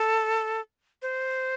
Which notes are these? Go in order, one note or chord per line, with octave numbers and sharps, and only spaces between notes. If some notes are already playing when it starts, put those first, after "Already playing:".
Already playing: A4
C5